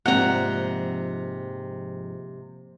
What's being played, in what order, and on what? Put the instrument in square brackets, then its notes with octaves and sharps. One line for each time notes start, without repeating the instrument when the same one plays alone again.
[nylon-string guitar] F2 G#2 D5 [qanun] C3 A#5 [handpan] F3 A#3 [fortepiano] F#5